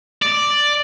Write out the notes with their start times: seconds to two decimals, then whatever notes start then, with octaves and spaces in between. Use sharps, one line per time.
0.22 D5